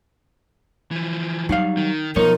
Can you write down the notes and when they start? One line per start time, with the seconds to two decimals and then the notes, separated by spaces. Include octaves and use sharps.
0.91 E3 F3
1.49 F#3 G3 D#4 F5
1.77 D#3
2.16 B1 F3 B3 D#4 A#4 C#5